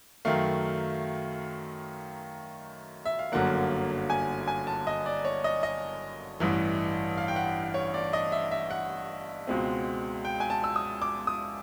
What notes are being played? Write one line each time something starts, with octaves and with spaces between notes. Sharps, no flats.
F#2 D#3 F#3 A3 F5
E5
F5
G1 F#2 D3 F#3 A#3 F#5
G#5
G#5
A5
D#5
D5
C#5
D#5
D#5
A1 G2 E3
F5
G5
F#5
C#5
D5
D#5
E5
E5
F#5
C#2 B2 G#3 C4
G5
G#5
A5
E6
D#6
D6
D#6